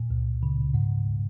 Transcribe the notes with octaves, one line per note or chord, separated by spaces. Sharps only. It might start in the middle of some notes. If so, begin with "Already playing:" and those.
Already playing: A#2
C#2
C#3
G#2